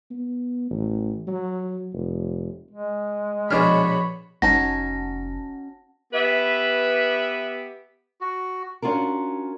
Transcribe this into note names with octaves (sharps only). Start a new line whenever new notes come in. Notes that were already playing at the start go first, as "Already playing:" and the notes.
B3
A1
F#3
F1
G#3
A#1 B2 D4 G#4 C#5 B5 F6
F1 C#4 D#4 F#4 F#5 A5 A#6
B3 G4 B4 E5
F#4
C#4 D4 F4 F#4 A#4